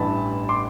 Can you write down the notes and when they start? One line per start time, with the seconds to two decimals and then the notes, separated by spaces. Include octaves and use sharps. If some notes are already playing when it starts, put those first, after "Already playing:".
Already playing: A1 G2 E3 A5 B5
0.49 C6 D6